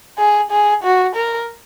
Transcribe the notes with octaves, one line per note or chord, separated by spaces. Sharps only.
G#4
G#4
F#4
A#4